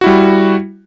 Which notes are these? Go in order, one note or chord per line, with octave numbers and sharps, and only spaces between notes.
G3 E4 F#4